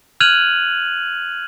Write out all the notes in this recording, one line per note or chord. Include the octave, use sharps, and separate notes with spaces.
F6 F#6 G#6 D#7 F7 F#7